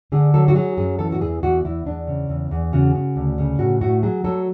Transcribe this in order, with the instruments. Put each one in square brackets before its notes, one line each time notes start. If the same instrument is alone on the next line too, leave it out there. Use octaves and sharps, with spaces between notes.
[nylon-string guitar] D3 G#4
F#3 A4
F#4
F#3 G#4
F#2 G#4
E3 A4
F#4
E2 G#4
E2 F#4
E2 E4
E2 D4
C#3
E2
E2
C#3 F#4
C#3
D2
C#3
A2 F#4
A2 F#4
F#3 G#4
F#3 A4